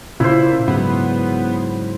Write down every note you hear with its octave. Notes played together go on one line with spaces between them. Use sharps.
A#2 C#3 E4 C5
G#2 C#3 F#3 B3